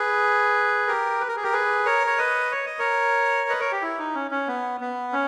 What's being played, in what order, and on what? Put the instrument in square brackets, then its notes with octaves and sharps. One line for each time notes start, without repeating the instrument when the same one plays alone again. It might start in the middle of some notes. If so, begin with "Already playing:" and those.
Already playing: [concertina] G#4 B4
G4 A#4
B4
A#4
G#4
G4 A#4
G#4 B4
A#4 C#5
C#5
B4 D#5
C#5
D#5
A#4 C#5
B4 D#5
A#4 C#5
G4
E4
D#4
C#4
C#4
B3
B3
C#4